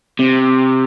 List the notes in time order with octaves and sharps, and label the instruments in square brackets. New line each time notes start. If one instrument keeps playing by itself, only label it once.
[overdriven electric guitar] C3